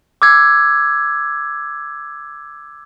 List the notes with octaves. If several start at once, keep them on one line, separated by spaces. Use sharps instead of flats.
D6 E6 G#6